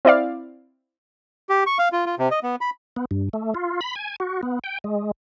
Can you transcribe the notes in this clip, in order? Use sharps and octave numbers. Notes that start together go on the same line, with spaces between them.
C4 E4 D5 F5
G4
C#6
F5
F4
F4
C3
D#5
B3
B5
B3
G2
A3
F4
B5
G#5
F#4
B3
G5
G#3